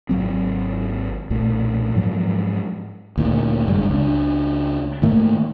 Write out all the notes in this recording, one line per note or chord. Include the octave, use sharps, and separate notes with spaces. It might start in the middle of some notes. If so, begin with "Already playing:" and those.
G#1 E2 F#3 C4
B1 A#2 A3
G#2 F3 F#3 G#3
D2 A#2 D#3
F#1 G2 B2 G#3
C#2 D4
G#2 D#3 A3 A#3